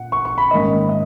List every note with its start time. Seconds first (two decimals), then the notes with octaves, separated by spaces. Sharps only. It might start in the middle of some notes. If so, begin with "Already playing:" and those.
Already playing: A#2 F#5
0.12 C#6
0.25 C#6
0.38 B5
0.51 G#2 D#3 A#3 C#4 D#5
0.89 D#5